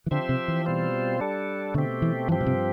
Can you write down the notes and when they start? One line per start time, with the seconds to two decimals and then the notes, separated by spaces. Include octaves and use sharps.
0.06 E3
0.11 D3 F3 C4 G4 C5 E5
0.29 C3
0.48 E3
0.66 B2 G3 C4 F4 C5
1.21 G3 D4 A4
1.74 B2 D3 A3 C4 G4
2.02 E3
2.29 G2 E3 F3 C4 G4
2.41 B2
2.46 C3